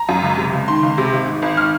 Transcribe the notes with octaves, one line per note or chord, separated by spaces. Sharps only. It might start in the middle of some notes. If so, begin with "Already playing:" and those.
Already playing: A#5
F#2
C#2
C3
C#2
D#3 C6
C#2
C3
G#1
G#2
G#1
D#3 F6